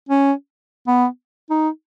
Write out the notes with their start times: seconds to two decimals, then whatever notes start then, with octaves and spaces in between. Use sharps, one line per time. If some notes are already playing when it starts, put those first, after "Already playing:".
0.09 C#4
0.87 B3
1.50 D#4